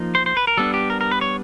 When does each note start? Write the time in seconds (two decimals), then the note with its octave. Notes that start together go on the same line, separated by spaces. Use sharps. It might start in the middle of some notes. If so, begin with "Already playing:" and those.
Already playing: F3 A#3 D#4
0.15 C5
0.26 C5
0.37 B4
0.47 A#4
0.58 G3 B3 D4 A4
0.74 G4
0.90 A#4
1.01 A#4
1.11 B4
1.21 C#5